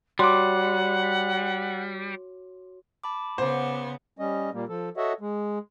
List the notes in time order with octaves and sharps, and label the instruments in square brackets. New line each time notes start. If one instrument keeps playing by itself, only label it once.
[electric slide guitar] G3 [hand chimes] F#4 C#5 [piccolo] F#5 [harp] C6 D6
[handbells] A5 B5 D6
[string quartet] C#3 B3 [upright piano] C5 [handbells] F#5 D6
[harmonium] G3 C#4 D#5
A#2 G3 A#3
F3 A4
F#4 A4 C#5 D#5 E5 F#5
G#3